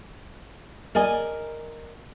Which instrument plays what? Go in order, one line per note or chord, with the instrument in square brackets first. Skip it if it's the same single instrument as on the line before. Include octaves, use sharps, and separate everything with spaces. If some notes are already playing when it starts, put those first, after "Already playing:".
[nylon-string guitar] A#4 D5 D#5 G#5